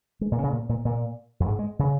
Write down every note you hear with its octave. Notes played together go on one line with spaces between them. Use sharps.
G#3
A#2
C#3
A#2
A#2
A#2
F2
G#2
G#3
C#3